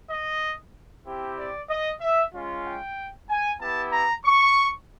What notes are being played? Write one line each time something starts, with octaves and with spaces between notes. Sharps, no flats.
D#5
C4 E4 G4
D5
D#5
E5
G#3 C#4 F4
G5
G#5
B3 E4 G4 A5
A#5
C#6